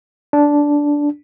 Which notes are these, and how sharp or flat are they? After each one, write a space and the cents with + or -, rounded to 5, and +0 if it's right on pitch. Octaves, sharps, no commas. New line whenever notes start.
D4 -10